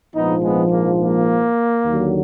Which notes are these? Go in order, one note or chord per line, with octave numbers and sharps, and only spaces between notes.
A#1 G#2 F3 B3 D#4
G#3 B3
A#3
A#3
D#2 D3 F#3